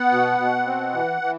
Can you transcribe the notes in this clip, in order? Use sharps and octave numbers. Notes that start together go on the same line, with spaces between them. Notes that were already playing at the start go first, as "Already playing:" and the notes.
Already playing: B3 F#5
B2
B2
C4
E3
E3